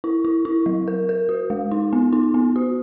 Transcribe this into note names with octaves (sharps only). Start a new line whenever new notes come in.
E4
E4
E4
F#3
A#4
A#4
F#4
G#3
D#4
B3
D#4
B3
F#4